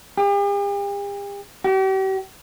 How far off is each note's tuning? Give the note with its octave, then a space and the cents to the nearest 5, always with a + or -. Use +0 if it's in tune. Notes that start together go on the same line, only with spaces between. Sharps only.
G4 +45
G4 -40